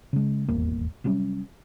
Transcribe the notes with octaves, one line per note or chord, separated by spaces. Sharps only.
C#3 G#3
D#1 G#1 E2 A#3
C3 F#3 G3 C#4